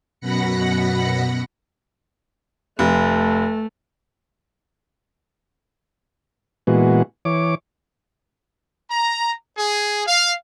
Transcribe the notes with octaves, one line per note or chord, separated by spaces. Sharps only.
F#2 B2 F#5 B5 A#6 C#7
F1 A3
A#2 E3 G#3 B3 F#4
E3 C#5 D6
A#5
G#4
F5